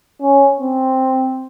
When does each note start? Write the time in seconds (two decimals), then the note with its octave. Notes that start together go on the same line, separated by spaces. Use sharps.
0.22 C#4
0.60 C4